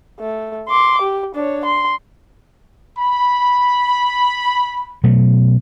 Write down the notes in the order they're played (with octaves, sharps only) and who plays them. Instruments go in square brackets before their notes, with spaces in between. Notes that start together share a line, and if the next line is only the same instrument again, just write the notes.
[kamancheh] A3
C6 D6
G4
D4 C#5
C6
[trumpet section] B5
[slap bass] B2 F#3 A3